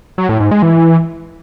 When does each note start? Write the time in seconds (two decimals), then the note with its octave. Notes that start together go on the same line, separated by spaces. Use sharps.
0.18 F#3
0.29 A2
0.40 G#2
0.51 G#3
0.62 E3